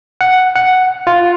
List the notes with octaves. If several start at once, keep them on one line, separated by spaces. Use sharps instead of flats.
F#5
F#5
F4